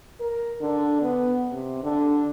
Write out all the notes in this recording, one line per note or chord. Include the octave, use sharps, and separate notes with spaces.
A#4
D3
B3
C3
D3